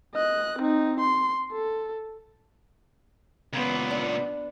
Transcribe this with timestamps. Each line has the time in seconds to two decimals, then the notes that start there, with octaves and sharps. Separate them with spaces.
0.15 D#5 F#6
0.59 C4 D#4
1.00 C6
1.52 A4
3.53 C#2 A#2 B3
3.90 D4